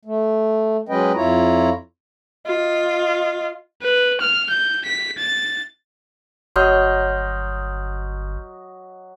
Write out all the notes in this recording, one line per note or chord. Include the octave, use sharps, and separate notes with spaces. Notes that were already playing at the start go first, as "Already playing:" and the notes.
A3
F#3 G#3 C#4 B4 D#5 G5
F2 E4 F4 C#5 A#5
F4 D#5
B4
F6
G6
B6
A6
G1 F#3 D#5 C6 F6 G6